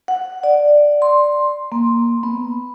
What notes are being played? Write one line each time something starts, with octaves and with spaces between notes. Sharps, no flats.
F#5
D5
C6
A#3
B3